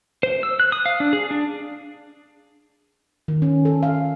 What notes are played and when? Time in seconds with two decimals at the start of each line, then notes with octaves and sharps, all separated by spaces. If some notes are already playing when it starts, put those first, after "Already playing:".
0.23 C5
0.43 E6
0.60 F#6
0.72 D#6
0.86 F5
1.00 D4
1.13 G#4
1.31 D4
3.28 D#3
3.42 C#4
3.65 A4
3.83 F5